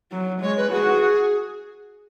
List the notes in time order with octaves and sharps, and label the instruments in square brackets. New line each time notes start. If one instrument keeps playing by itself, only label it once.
[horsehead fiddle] F#3
[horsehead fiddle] G#3 [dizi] C#5
[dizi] B4
[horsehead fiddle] F#4 [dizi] G#4